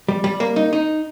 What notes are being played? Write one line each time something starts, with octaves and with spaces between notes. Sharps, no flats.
G3
G3
A#3
D#4
D#4